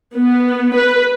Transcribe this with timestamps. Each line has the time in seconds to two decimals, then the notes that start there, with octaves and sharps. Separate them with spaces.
0.15 B3
0.74 B4